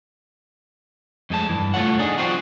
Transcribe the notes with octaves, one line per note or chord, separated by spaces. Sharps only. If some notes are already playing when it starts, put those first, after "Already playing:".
F2 G#3 A3 A5
G2 A#2 E3
C2 A3 F4 C#5 F#5
D4 D#4 G#4
F3 G3 C4 F4 F#4